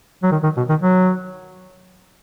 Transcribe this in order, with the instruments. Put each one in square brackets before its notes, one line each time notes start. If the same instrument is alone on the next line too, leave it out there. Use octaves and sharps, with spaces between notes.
[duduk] F#3
D#3
D#3
B2
D#3
F#3